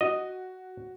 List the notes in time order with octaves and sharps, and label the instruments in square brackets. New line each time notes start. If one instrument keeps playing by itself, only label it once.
[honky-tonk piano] F#4 [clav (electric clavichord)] D#5